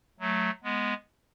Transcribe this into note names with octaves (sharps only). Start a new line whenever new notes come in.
F#3 A3
G#3 B3